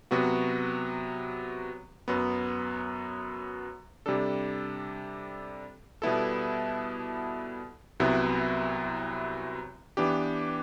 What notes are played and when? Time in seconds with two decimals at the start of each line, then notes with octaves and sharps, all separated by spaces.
0.11 C3 F#3 B3 F#4
2.08 F#2 F#3 B3
4.06 C3 G3 D4 A4
6.02 B2 G3 B3 E4 A4
8.00 C2 C3 F#3 B3 E4
9.97 E3 B3 D4 G4